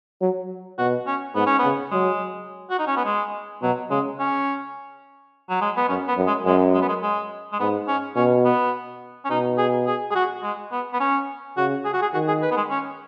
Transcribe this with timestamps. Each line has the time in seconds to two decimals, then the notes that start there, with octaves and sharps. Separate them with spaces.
0.21 F#3
0.79 B2 F#4
1.07 C#4
1.35 G#2 B3
1.47 C#4
1.59 C#3 B3
1.91 F#3 G#3
2.70 F#4
2.79 D#4
2.87 C#4
2.97 B3
3.05 G#3
3.62 B2 F#3
3.90 C#3 G#3
4.20 C#4
5.50 F#3
5.61 G#3
5.77 B3
5.89 F#2 C#4
6.08 B3
6.17 F#2
6.27 G#3
6.46 F#2 G#3
6.74 G#3
6.82 B3
6.89 G#3
7.03 G#3
7.52 G#3
7.59 G#2 B3
7.88 C#4
8.16 B2 C#4
8.45 B3
9.25 C#4
9.30 B2 D#4
9.58 G#4
9.87 G#4
10.11 G#4
10.15 F#4
10.43 G#3
10.72 B3
10.94 B3
11.00 C#4
11.57 C#3 F#4
11.85 G#4
11.94 F#4
12.02 G#4
12.14 D#3 F#4
12.28 G#4
12.43 B4
12.51 B3
12.57 G#3
12.70 C#4